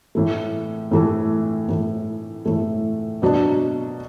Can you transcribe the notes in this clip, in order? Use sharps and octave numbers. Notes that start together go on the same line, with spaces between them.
A2 E3 A3
A2 E3 A3
A2 E3 A3
A2 E3 A3
B2 F#3 B3 D4